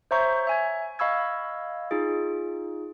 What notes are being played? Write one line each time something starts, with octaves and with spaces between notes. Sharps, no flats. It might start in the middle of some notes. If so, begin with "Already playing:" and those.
C5 C#5 E5 A#5 C#6 G6
E5 G#5 G#6
D#5 F5 B5 C#6 E6 G#6
D#4 F4 G#4